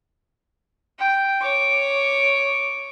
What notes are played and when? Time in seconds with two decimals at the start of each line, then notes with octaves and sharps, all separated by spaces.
0.99 G5
1.41 C#5 D6